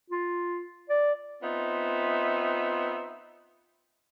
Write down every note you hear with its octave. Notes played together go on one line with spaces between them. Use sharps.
F4
D5
B3 C4 D#4 F4 E5